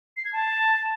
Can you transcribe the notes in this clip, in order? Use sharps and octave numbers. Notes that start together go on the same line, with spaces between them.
C7
G#6
A5